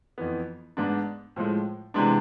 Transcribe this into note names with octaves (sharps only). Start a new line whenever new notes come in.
F2 E3 B3
G#2 G#3 B3 D4
A2 F3 G#3
C3 E3 G#3 B3 D4